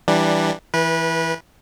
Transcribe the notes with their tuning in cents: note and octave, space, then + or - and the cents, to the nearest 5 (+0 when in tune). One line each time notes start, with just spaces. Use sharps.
E3 +0 G3 -5 D4 +10
E3 +0 B4 -25